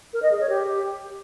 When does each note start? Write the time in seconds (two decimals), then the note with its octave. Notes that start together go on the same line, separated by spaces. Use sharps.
0.13 A#4
0.22 D#5
0.31 G#4
0.40 C#5
0.49 G4